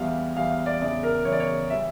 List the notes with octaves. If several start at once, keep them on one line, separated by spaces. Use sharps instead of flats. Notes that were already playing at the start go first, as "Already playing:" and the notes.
Already playing: E2 E3 G3 F5
E2 E3 G3 F5
F5
D5
E2 C#3 E3 D5
A#4
E2 C#3 E3 C#5
D5
C#5
E3 G3 E5